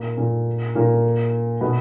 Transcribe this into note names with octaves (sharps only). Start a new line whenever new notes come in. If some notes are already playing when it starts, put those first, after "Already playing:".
Already playing: A#2 A#3
A#2 A#3
A#2 A#3
B2 B3